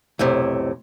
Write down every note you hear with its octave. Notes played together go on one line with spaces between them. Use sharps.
B1 F2 A2 C3